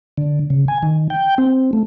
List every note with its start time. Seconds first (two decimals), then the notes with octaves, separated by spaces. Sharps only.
0.18 D3
0.50 C#3
0.68 G#5
0.83 D#3
1.10 G5
1.38 C4
1.73 A3